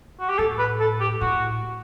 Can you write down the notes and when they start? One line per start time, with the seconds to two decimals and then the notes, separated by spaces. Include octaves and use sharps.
0.20 F#4
0.29 G4
0.38 A2 A4
0.59 B4
0.80 A4
1.00 G4
1.21 A2 F#4